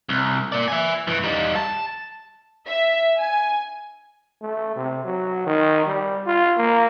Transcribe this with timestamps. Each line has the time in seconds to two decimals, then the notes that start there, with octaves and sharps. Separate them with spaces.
0.09 C2
0.52 A#3 D5
0.68 E5 G#5
1.07 G2 E3
1.24 G3 D#4
1.56 A5
2.67 E5
3.18 G#5
4.42 A3
4.76 C3
5.05 F#3
5.47 D#3
5.86 G3
6.27 F4
6.57 A#3